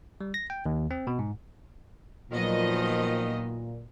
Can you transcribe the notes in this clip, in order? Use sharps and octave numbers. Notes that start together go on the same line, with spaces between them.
G3
A#6
G5
D#2
C4
B2
G#2
A#2 D#3 F3 F#3 B3 D#5